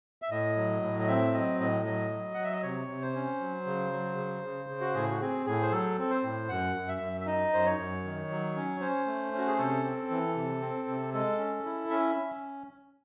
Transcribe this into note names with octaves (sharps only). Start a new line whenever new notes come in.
E5
A2 D#5
F#3
A2
D#5
C4 E5
F#3 D#5
A2 D#5
F#3 D#5
F#3
F#3 F#5
E5
D#5
C3 C#5
C3
C5
C#4
F#3
C#3
F#3
C#3
C#3
C#3
F#4
A2 G#4
F#4
C4 G#4
A2 G#4
C5
F#3 A4
C4 A4
C5
A2
F#2 F#5
F#2
E5
F#2
E5
D#4 D#5
F#2 C5
C#5
F#2
D#3
F#3
C#4
C#4 C5
A3
C#4 F#4
G#4
C3 A4
C4
E3
C3
C4
C3
G#3 A4
C#4
E4
C#4 E5
C#4